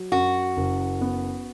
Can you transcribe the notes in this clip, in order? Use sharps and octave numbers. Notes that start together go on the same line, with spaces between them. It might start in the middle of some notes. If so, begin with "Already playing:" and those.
Already playing: F#3
F#2 F#4
F#1
B3